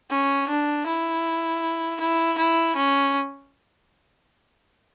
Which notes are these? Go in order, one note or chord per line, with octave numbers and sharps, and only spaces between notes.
C#4
D4
E4
E4
E4
C#4